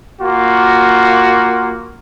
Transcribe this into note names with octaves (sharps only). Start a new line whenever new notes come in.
A#3 F4 F#4